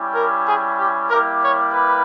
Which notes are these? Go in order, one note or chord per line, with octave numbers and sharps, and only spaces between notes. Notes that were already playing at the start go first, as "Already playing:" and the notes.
Already playing: G3 C#4 E4 G4
A#4
G#4
G4
G3 A#3 E4 G4 A#4
C#5
B4